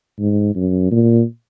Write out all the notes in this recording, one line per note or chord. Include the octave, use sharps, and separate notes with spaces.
G#2
F#2
A#2